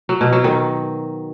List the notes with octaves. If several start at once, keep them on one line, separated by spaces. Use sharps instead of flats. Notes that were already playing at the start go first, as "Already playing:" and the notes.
F#3
B2
F#3
D#3